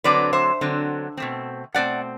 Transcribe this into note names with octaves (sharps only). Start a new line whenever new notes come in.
D3 F#3 C4 B4 D5
C5 E5
D3 F#3 C4
B2 A3 C4
B2 A3 C4 D5 F#5